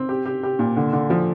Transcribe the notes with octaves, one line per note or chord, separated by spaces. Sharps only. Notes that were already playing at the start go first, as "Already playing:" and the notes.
Already playing: C4
G4
G4
G4
A#2
D3
D3
F3